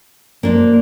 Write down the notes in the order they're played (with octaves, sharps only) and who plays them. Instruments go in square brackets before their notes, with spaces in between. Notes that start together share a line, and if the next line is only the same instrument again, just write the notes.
[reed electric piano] F#2 [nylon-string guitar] A#3 D4 C5